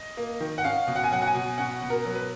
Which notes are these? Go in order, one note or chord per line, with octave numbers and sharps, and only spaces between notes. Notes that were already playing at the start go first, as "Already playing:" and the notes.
Already playing: D#5
A#3
D#3
F#5
C#4 F5
B2
F#5
G#5
F#3 F#5
F#5
G#5
B2
C#4 F#5
B2
A#4
F#3
B4